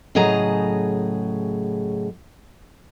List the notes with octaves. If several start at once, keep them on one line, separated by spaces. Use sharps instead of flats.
A2 C#3 F#3 G#4 D#5 A#5